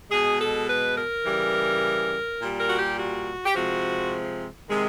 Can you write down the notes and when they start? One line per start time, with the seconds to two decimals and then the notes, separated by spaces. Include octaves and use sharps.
0.10 B2 G#3 G#4
0.39 A4
0.68 B4
0.97 A#4
1.25 C#3 E3 G3
2.40 A#2 G3
2.59 A#4
2.69 F#4
2.78 G4
2.98 F#4
3.46 G4
3.55 C3 F3 G#3 F#4
4.70 C3 D#3 G#3